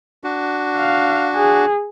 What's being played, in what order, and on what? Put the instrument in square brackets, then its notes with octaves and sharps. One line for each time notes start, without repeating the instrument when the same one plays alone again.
[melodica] D4 F#4
[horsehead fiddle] F5
G#4